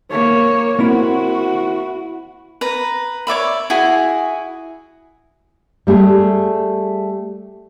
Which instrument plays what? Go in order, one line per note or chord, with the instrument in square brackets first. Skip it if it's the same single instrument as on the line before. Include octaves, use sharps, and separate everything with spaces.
[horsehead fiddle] A#3 C#5
[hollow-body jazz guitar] A#3 C4 E4 [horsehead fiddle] F#4
[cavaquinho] B4 A#5
C#5 D5 E5 B5
E4 F#4 G#4 G#5
[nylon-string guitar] G3 A3 G4 G#4